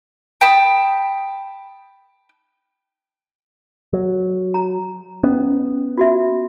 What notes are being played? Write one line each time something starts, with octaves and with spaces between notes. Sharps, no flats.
G5 A5 B5 D#6
F#3
A#5
B3 C#4
F4 F#4 E5